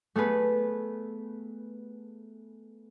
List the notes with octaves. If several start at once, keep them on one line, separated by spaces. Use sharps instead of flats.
A3 B3 G#4 B4